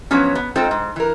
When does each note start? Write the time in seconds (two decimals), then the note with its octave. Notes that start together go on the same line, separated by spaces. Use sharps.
0.11 F3 F#3 B3 C#4
0.35 B3
0.55 G#2 C4 D#4 F4 A4 A5
0.71 G#2
0.96 E3 A#4